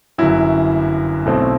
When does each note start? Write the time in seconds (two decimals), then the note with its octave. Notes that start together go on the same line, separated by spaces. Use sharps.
0.18 G1 F#2 F#3 E4
1.25 B1 B2 A3 C4